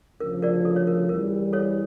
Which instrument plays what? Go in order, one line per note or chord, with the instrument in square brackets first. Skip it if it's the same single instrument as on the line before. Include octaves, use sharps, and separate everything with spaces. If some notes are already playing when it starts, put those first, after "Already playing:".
[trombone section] D2 C#3 F3 [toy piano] A#4
[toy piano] A#4 D5
A4
C#5
A#4
[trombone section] E2 E3 G3 [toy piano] A#4
[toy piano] A4 C#5